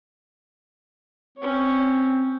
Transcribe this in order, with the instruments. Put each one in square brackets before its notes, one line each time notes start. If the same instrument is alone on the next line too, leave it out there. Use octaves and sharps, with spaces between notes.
[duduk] C4 [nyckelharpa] C#4 C#5